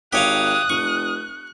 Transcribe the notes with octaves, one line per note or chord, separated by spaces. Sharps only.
G#1 G4 C#5 F5 D#6 F#6
F1 C#6